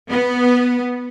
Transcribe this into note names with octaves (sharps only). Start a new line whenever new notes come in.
B3